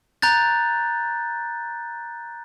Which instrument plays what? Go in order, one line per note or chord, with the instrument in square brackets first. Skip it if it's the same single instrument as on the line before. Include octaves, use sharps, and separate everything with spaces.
[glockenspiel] A#5 F#6 G6 A6